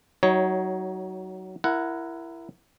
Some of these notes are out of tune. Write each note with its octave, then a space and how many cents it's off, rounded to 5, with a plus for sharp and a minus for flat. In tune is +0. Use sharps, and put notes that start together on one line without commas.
F#3 +20 D#4 +30 C#5 +0
E4 +20 A#4 +0 F#5 -5